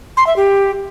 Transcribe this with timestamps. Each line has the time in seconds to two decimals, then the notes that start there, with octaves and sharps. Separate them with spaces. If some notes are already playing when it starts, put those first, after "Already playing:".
0.17 C6
0.27 E5
0.36 G4